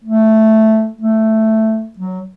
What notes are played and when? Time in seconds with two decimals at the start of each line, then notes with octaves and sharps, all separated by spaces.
0.05 A3
1.01 A3
1.98 F#3